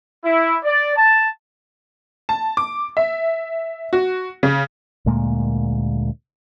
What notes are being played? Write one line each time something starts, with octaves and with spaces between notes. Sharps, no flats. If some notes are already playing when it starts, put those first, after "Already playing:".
E4
D5
A5
A5
D6
E5
F#4
C#3
D2 A#2 G#3 A#3